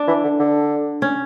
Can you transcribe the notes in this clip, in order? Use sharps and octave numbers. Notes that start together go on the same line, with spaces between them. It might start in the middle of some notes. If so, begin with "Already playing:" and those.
Already playing: D4
E3
D3
D3
C#4